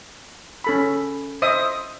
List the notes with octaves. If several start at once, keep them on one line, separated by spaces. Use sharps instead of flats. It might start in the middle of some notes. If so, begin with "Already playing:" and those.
C#4 A4 B5
C5 D#5 E5 D#6